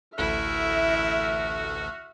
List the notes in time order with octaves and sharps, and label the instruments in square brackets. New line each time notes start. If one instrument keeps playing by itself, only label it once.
[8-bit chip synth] A1 D2 A4 [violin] E4 [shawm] F#4 [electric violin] E5 F6